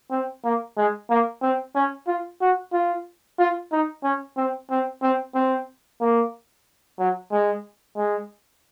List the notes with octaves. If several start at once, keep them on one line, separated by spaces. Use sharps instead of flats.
C4
A#3
G#3
A#3
C4
C#4
F4
F#4
F4
F4
D#4
C#4
C4
C4
C4
C4
A#3
F#3
G#3
G#3